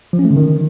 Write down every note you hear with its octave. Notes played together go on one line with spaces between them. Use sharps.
F3
C#4
A3
D3
D#3